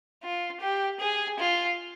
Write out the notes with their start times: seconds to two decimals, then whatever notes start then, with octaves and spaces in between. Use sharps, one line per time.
0.23 F4
0.61 G4
1.00 G#4
1.39 F4